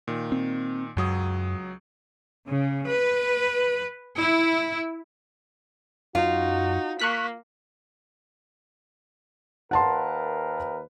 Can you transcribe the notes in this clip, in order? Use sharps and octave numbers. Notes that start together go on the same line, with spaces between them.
A#2 D#3
C4
C#2 F#2 F#3 D#6
C#3
B4
E4
F#2 D#4 F4 F#4
A#3 C#6 F#6 B6
D#2 A#4 B4 F#5 A5 C6